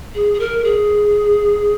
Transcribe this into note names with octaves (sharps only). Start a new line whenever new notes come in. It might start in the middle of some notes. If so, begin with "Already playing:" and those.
G#4
G#4
A#4
G#4